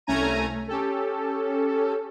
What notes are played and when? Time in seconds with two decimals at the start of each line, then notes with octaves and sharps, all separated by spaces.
0.07 C2 A3 C#4 G#5 A#5 D#7
0.68 C#4 G4 A4